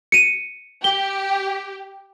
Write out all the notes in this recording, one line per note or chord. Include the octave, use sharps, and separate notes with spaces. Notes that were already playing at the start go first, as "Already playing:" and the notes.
C#7 D#7
G4 G7